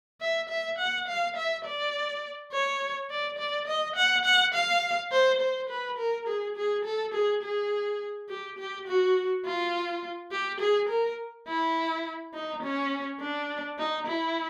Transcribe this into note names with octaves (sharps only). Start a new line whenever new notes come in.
E5
E5
F#5
F5
E5
D5
C#5
D5
D5
D#5
F#5
F#5
F5
C5
C5
B4
A#4
G#4
G#4
A4
G#4
G#4
G4
G4
F#4
F4
G4
G#4
A#4
E4
D#4
C#4
D4
D#4
E4